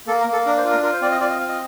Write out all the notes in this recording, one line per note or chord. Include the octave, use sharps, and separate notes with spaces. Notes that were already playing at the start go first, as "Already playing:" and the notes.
A#3 A4
A#4
A#3
A4
D4 A#4
C5
F4
A#4
F4 A#4
C5
C4 D5
D#5
F4 D5
D#5
C4 F5
D#5